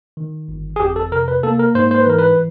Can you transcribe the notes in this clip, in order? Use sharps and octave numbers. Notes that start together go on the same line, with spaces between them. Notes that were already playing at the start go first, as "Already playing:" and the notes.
D#3
G1
G#4
F2 G4
A4
C3 A#4
B4
A#3 A4
A#4
G#2 C5
C5
B4
E3 A#4
B4